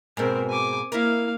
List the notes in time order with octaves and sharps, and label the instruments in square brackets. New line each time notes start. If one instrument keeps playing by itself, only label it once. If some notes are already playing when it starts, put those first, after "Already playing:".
[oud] G#2 B2 [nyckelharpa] C4 A#4
[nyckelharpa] G#5 D6
[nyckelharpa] A#3 F5 [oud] E4 A#4